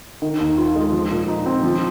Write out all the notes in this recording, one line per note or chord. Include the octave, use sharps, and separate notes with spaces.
D#3
D#2
F4
G#3
F3
A#2
D#4
C4
F3